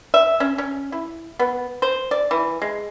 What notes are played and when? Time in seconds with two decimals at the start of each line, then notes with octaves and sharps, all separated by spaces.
0.14 E5
0.40 C#4
0.58 C#4
0.92 E4
1.39 B3
1.82 C5
2.11 D5
2.31 E3
2.62 G#3